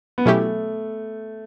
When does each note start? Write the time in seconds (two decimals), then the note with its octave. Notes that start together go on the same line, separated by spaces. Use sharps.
0.18 B3
0.26 B2 F#3 A3 C#4 E4 G4